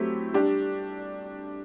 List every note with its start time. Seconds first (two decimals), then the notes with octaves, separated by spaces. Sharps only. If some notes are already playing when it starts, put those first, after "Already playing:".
Already playing: F#3 A3 C4 E4 G4
0.33 G3 D4 G4